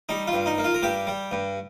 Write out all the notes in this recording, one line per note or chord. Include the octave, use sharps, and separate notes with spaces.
G3 D#4
F4
G2
D#4
A#3
F4
A#4
G2 G4
G3
G2